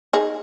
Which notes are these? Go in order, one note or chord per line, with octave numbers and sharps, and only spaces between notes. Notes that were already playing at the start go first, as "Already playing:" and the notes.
D#4 G#4